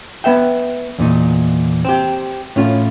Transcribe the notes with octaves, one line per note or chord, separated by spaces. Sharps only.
B3 B4 E5 G5
E2 A#2 D#4
C4 G4
A2 C#4 F4